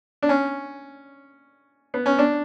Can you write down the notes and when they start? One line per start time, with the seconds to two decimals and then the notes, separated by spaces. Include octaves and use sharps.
0.22 D4
0.29 C#4
1.94 B3
2.06 C#4
2.19 D4